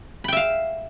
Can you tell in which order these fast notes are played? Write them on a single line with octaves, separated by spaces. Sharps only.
B5 G5 E5 F5